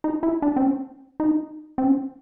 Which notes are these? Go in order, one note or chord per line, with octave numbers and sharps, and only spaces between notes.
D#4
E4
D4
C4
C#4
D#4
C4
C#4